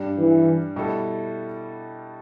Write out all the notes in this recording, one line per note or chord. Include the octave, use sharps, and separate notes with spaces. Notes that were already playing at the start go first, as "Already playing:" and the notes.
Already playing: G2 G3 D4
E3
B2 G3 E4 A4